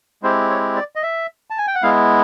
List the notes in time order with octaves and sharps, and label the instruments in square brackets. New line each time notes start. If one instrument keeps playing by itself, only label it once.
[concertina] G#3 C4 E4 G4 C5
C#5
D5
D#5
E5
A5
G#5
G5
F#5
G#3 B3 E4 F5